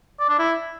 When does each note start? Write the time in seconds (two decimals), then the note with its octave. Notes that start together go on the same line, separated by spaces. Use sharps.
0.20 D5
0.29 D4
0.39 E4